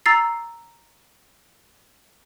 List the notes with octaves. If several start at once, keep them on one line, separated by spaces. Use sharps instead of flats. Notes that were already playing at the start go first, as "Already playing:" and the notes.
A#5 E6 A6 C7